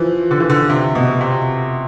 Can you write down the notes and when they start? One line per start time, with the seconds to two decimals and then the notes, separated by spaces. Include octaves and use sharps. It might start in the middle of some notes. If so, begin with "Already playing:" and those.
Already playing: E3 F3
0.31 D3
0.40 E3
0.50 D3
0.70 C3
0.95 B2
1.21 C3